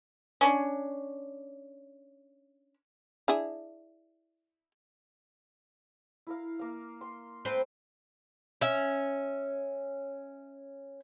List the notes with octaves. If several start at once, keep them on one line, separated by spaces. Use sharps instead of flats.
C#4 D4
D4 E4 G#4
E4 A#4 F5
A#3 A#4 F5
C6
A3 C4 B4
C#4 E5